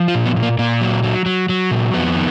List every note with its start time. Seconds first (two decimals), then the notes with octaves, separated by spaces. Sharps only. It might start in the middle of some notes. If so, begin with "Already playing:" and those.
Already playing: F3
0.08 F4
0.14 A#2
0.26 B3
0.36 A#2
0.42 A#3
0.59 A#2 A#3
0.82 F#3
1.03 F#3
1.26 F#3
1.49 F#3
1.71 A#2
1.94 F2 B3
2.16 D#3